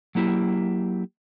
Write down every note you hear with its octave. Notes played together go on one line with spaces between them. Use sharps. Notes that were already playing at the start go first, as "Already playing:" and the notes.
F#3 A#3 E4 G4